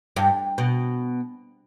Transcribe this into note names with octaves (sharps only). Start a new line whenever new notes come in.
G2
B2